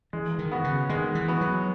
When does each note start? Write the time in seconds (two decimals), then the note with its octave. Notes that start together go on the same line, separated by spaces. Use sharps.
0.13 E3 G#3
0.39 D#3
0.52 B3 F#4
0.64 C#3
0.90 D#3 G#3
1.15 E3
1.28 B3 F#4
1.41 F#3